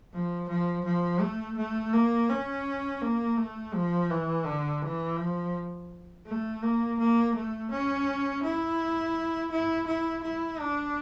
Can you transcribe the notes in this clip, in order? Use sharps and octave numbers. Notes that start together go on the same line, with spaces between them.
F3
F3
F3
A3
A3
A#3
C#4
A#3
A3
F3
E3
D3
E3
F3
A3
A#3
A#3
A3
C#4
E4
E4
E4
E4
D4